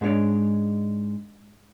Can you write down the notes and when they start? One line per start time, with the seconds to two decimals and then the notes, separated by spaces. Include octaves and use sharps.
0.01 G#2 G#3 D4 G4 C#5 D5